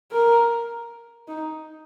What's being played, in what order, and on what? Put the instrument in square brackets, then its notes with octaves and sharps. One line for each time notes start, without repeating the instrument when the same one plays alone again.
[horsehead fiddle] A#4
D#4